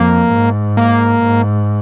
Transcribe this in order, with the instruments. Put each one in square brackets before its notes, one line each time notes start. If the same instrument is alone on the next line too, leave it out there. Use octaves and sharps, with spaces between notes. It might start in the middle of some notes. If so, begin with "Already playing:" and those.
Already playing: [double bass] F2 [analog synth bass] A#3
[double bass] G#2
[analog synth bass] A#3
[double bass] G#2